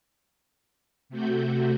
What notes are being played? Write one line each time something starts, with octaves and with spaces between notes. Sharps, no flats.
C3 A3 F#4 G6